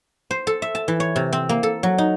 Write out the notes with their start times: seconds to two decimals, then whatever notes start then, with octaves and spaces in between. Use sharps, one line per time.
0.31 C5
0.47 A4
0.62 E5
0.75 A5
0.88 E3
1.00 C#5
1.16 C3
1.33 C4
1.49 A#3
1.63 A4
1.83 F#3
1.98 D#4